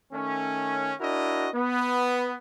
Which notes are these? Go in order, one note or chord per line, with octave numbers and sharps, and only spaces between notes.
D#3 A3 C#4
D4 E4 F#4 A#4 D#5
B3